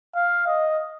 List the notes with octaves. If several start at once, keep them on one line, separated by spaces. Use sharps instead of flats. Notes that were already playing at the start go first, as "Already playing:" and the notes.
F5
D#5